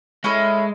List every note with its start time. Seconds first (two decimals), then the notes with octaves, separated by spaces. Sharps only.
0.24 G#3 C#4 E4 A4